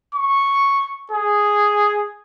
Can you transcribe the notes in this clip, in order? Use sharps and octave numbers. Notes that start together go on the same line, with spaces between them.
C#6
G#4